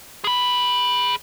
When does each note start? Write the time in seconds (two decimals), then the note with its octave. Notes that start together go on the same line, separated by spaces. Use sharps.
0.24 G#4 B5